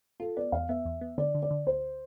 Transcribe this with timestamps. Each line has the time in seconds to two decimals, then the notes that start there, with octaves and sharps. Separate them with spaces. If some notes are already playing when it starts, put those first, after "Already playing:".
0.20 F4 A4
0.37 B3 D5
0.52 E2 F5
0.69 B3 E5
0.85 E2
1.01 B3
1.18 D3 D5
1.35 D3
1.43 D5
1.51 D3
1.67 D2 C5